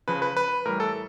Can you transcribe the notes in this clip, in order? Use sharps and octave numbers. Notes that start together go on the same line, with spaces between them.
C#3 F3 B4
B4
B4
A2 E3 G3 A#4
A4